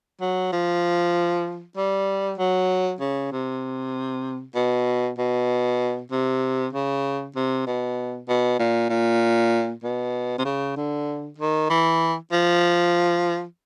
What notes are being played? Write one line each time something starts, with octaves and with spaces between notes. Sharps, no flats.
F#3
F3
G3
F#3
C#3
C3
B2
B2
C3
C#3
C3
B2
B2
A#2
A#2
B2
C3
C#3
D3
D#3
E3
F3